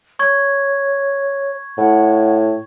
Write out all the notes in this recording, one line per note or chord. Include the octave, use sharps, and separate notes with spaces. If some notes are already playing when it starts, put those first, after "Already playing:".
C#5 C#6 G#6
A2 F#5